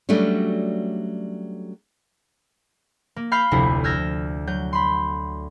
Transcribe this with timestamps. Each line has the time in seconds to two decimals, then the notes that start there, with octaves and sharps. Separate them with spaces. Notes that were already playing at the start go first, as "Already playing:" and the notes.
0.09 F#3 G3 A3 C#4 D4 F#4
3.16 A#3
3.32 F5 B5 F6 G6 C7
3.51 F1 D2 E4
3.84 E6 F6 G6 G#6 A#6
4.47 F#3 G6
4.73 B5 C6